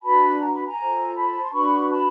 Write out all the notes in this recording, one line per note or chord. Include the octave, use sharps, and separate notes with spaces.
D4 F#4 B4 A5 B5
A#5
B5
G#5 A#5
F4 A4 C5
A5 B5
C6
D4 F#4 B4 B5 C#6
A5 B5